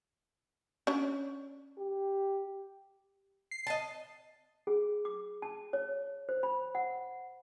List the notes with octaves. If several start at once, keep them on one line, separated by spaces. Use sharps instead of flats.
C#4 D4
G4
C7
D#5 A5
G#4
D6
A5
C#5
C5
B5
F#5